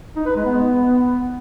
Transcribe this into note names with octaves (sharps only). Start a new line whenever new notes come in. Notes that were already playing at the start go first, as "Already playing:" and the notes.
D#4
B4
G#3
B3